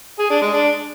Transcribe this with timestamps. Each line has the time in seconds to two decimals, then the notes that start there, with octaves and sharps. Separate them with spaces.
0.19 G#4
0.30 D4
0.41 G#3
0.52 D4